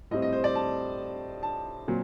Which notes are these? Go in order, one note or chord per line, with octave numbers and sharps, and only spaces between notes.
A2 G3 C4 D#5
D#5
C5
D5
A5
A5
A#2 F#3 C4